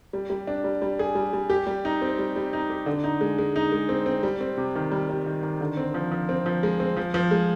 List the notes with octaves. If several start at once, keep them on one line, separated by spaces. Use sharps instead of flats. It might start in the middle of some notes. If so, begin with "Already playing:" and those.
G3
G3
D4
G3
G3
G#4
G3
G3
G4
G3
D#4
C4
G3
G3
D#4
G4
D3
D#4
G#3
G#3
D#4
G#3
C4
C4
G3
C4
C3
D#3
G3
G3
D#3
D#3
D3
C4
F3
F3
C4
F3
G#3
C4
F3
F3
G#3